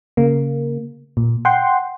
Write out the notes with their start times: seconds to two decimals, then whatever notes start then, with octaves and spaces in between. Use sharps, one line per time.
0.17 C#3 A#3
1.17 A#2
1.45 F#5 G5 C6